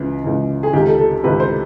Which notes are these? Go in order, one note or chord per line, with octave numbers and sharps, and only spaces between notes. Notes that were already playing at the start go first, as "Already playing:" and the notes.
Already playing: C#2 C#3 E3
C#2 C#3 E3
G#4
C#2 C3 D#3 G4
A4
A4
C#2 C3 D#3 B4
C5